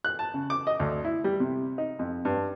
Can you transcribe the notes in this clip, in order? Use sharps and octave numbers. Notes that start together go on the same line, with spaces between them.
F#6
A5
C#3
D6
D#5
D2
E4
G3
C3
D#4
F2
G2